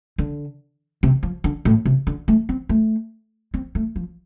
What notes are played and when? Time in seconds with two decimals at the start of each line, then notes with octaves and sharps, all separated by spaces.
0.18 D3
1.03 C3
1.23 F3
1.44 D3
1.65 A2
1.85 C3
2.07 D3
2.28 A3
2.49 C4
2.69 A3
3.54 C4
3.75 A3
3.96 F3